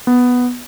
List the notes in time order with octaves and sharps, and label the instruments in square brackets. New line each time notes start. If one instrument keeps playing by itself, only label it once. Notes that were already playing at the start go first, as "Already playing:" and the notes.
[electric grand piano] B3